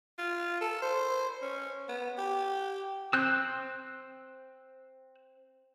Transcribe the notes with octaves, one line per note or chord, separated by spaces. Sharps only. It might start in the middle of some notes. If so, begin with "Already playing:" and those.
F4
A4
C5
C#4
B3
G4
C4 E6 F#6 G6